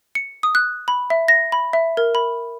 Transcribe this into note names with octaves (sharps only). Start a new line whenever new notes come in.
C#7
D#6
F#6
B5
E5
A#6
B5
E5
A#4
B5